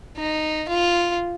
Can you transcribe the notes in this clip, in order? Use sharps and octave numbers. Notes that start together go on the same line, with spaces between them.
D#4
F4